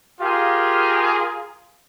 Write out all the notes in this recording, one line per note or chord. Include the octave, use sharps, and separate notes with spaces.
F4 G4 G#4 A#4 F5